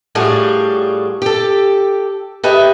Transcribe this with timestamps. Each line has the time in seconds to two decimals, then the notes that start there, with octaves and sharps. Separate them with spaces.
0.15 A2 G3 D4 F4 F#4 G#4
1.22 G4 A4
2.43 G4 A4 B4 D#5 E5